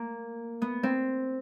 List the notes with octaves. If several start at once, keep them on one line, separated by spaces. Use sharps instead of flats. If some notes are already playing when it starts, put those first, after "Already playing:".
Already playing: A#3
B3
C4